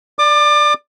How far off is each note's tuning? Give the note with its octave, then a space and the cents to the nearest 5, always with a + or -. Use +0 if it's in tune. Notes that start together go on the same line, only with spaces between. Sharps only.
D5 +0 D6 +30